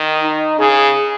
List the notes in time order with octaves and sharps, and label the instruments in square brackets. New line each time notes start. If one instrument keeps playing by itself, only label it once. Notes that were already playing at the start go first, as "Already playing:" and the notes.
Already playing: [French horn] D#3
[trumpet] D#4
[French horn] C#3 [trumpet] G#4